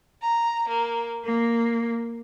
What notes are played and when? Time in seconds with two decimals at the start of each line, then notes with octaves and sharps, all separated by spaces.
0.22 A#5
0.68 A#3
1.23 A#3